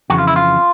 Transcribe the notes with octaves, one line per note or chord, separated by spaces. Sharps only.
F2 C#3 E3 F#4
F4
E4
F4